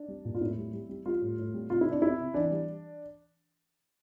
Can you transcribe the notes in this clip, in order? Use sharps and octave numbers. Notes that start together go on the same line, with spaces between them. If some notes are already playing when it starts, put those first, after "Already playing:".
Already playing: D4
G3
A#2
F4
A2 E4
G3
G3
G3
G3 F4
A2
A2
G3
C3 F4
C3 E4
D4
C3 E4
C3
E3 D4
G3